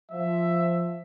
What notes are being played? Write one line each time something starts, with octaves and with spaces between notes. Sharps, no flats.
F3 E5